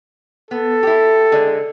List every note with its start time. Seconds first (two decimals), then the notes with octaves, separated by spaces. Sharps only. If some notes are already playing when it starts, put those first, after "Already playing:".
0.51 B3 A4
0.83 E4 G4
1.32 D3 G#3